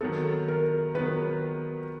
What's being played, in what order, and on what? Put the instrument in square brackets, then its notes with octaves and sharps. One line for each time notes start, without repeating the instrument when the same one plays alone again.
[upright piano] D#3 F#3 B3 [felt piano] A4
[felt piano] A#4
[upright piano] D#3 F#3 B3 [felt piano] B4